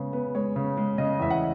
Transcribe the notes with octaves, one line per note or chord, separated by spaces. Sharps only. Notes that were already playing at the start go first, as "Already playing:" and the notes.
Already playing: C#3 G#3 B3
B3
G#3 C#5
C#3
G#3
C#3 D#5
E2 E5
F#5